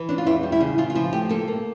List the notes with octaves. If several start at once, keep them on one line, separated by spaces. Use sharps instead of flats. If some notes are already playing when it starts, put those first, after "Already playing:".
Already playing: E3
C#4 D4
F4
E2 E4
G3
E4
C#3
C#3 F4
F4
F3 E4
A3 G4
A#3 A4
A#3